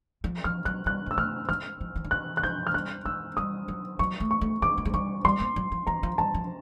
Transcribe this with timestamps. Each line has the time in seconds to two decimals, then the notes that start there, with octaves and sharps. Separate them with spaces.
0.24 F3
0.44 F3 F6
0.65 F#3 F#6
0.86 G3 F#6
1.06 G#3 E6
1.17 A3 F6
1.49 G#3 F6
1.81 F3
1.96 E3
2.04 D#3
2.11 E3 F#6
2.37 F#6
2.43 F3 G6
2.67 F6
2.74 G3 F#6
3.05 G#3 E6
3.37 G3 D#6
3.68 F#3
3.99 F#3 C#6
4.20 A3
4.31 C#6
4.41 A3
4.62 G#3 D6
4.78 A3
4.85 G#3
4.94 G3 C#6
5.25 G3 C6
5.40 A#3
5.56 F#3
5.72 F3
5.87 E3 A#5
6.03 F3
6.18 G3 A5
6.34 F3